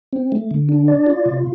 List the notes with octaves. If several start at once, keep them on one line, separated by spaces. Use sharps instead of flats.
C4
A3
D3
D4
D5
F4
C3